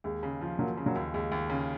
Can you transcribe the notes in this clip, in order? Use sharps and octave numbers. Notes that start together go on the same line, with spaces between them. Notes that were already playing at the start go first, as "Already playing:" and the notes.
D#2 G#3
C#3
F3
F3 F#3 A#3
C#3
F#3 A#3
D#2
D#2 G#3
D#2
C#3